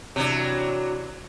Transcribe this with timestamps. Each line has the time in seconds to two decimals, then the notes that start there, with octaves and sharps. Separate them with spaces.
0.16 C3 E3 F#3 D4